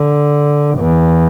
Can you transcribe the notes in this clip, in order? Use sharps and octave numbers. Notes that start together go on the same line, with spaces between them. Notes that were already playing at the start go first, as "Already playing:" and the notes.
Already playing: D3
E2